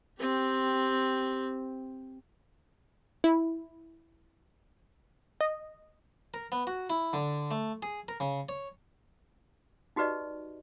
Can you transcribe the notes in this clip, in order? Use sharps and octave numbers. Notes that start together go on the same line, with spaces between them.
C4 G4
E4
D#5
A#4
B3
F#4
E4
D3
A3
G#4
A#4
C#3
C#5
D#4 F#4 G4 B4 D5 D#5